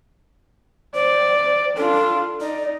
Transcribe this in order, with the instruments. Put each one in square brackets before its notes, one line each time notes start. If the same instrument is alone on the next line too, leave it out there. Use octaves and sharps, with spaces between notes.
[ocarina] C5 [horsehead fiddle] D5
[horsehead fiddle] D4 F4 [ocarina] A4
[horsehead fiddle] D#4 [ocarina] D5